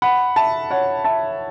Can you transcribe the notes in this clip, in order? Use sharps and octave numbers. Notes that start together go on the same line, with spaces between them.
F#5 B5
E5 A5
C#5 F#5
E5 A5